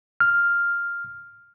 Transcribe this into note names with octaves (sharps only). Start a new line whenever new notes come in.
F6